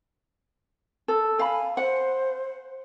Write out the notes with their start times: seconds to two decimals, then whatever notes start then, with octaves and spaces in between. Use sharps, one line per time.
1.08 A4
1.39 F5 G#5 B5
1.77 C5 F#5